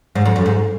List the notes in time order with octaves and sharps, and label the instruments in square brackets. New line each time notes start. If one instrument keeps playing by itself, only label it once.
[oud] G#2
F2
F#2
G#2